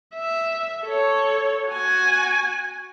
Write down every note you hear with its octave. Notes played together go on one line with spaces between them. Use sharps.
E5
A4 C#5
F#4 G#5